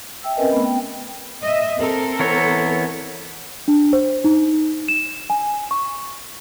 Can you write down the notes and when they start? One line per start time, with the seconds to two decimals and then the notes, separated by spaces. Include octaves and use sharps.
0.23 E5 G5 E6
0.36 C4 C#4 A#4 B4 D#5 G#5
0.52 A3 B3 B5
0.65 G5
1.43 D#5 E5
1.78 C4 A4 A#4
2.19 E3 B3 C#5
3.68 D4
3.93 C5
4.24 D#4
4.88 E7
5.30 G#5
5.71 C#6